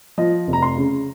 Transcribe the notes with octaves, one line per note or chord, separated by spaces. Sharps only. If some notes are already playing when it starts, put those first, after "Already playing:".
F3 D#5
F1
A#5
C6
C#3